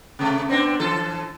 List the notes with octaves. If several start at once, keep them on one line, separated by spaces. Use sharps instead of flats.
C3 A3
B3 C4 D4
E3 A4